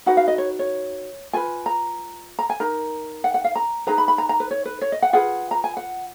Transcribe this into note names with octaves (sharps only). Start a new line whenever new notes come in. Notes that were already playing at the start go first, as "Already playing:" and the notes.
D#4 F#4 B4 F#5
F5
D#5
C#5
C#5
F4 B4 G#5
A#5
A#5
G#5
D#4 A#4 A#5
F#5
F#5
F5
A#5
D#4 G#4 B4 A#5
B5
B5
A#5
A#5
B4
C#5
B4
C#5
D#5
F#5
F4 G#4 B4 F#5
A#5
G#5
F#5